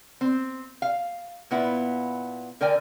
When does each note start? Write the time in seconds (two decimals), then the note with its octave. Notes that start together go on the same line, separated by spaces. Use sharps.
0.21 C4
0.82 F5
1.51 A#2 B3 E4
2.61 D3 A#4 D5 G5 G#5